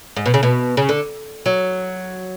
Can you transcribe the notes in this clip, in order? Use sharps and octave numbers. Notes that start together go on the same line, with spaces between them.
G#2
B2
C#3
B2
C#3
D3
F#3